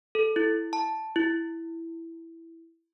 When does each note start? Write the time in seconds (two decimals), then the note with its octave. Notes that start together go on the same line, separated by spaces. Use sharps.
0.15 A4
0.36 E4
0.73 A5
1.16 E4